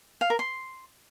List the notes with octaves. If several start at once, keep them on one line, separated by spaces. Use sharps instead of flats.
F5
A#4
C6